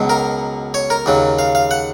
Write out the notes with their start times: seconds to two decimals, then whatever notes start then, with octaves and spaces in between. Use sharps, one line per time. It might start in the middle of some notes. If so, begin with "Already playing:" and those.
Already playing: C#2 B2 F#3
0.10 A#4
0.74 C#5
0.90 A#4
1.06 D#2 C#3 F#3
1.39 F5
1.55 F5
1.71 F#5